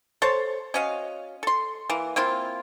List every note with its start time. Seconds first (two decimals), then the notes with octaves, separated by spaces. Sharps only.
0.22 A4 C5 C#5 A5
0.74 C#4 F#4 D#5 F5
1.43 A4 C6
1.90 E3 A#3
2.16 A#3 C4 E4 F4